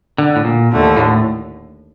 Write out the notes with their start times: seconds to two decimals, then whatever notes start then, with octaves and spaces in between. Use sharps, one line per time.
0.18 D3
0.36 A2
0.45 A#2
0.71 D#2 D3 A3
0.97 A2